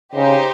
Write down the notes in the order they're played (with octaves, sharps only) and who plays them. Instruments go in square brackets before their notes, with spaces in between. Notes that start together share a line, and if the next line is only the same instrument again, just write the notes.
[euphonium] C#3 [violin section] D#4 G4 C5